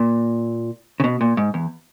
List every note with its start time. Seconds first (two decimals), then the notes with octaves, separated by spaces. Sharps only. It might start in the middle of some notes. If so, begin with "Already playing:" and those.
Already playing: A#2
1.00 C#3
1.04 B2
1.21 A#2
1.37 G#2
1.54 E2